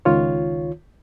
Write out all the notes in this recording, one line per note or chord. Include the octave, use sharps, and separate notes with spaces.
C#2 D#3 F4 C#5